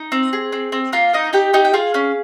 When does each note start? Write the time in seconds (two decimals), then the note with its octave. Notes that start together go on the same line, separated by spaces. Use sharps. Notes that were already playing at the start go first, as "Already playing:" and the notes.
Already playing: D#4
0.12 C4
0.33 G#4
0.52 C4
0.72 C4
0.93 A#3 F4 F5
1.13 A#3 D#4 D#5
1.33 D#4 G4 G5
1.53 D#4 G4 D#5
1.65 G5
1.73 F4 G#4 F5
1.94 C#4